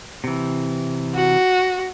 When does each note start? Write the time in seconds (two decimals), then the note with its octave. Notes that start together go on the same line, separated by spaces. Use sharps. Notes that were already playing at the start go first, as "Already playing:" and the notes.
0.24 C3 E3
1.15 F#4